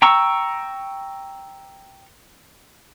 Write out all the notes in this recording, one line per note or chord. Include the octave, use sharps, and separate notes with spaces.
G5 A#5 C#6 E6